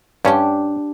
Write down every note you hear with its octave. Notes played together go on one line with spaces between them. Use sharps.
G2 C#4 D4 G4